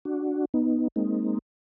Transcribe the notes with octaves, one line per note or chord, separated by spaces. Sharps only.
D4 F#4
B3 D#4
G#3 A#3 C4 D#4